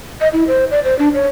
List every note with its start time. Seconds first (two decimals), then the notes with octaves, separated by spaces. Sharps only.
0.21 D#5
0.33 E4
0.48 C5
0.71 D5
0.85 C5
0.99 D4
1.14 C#5